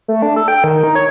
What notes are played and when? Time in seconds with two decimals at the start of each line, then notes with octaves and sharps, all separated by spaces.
0.08 A3
0.22 D4
0.36 A4
0.48 G5
0.64 D#3
0.83 D#4
0.95 C#5